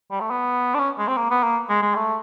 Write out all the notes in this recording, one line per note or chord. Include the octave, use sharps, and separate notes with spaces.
G3
A3
B3
D4
C#4
G#3
C4
A#3
B3
A#3
G#3
G#3
A3